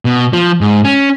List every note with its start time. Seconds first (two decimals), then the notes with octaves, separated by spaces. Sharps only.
0.05 B2
0.33 F3
0.61 G#2
0.84 C#4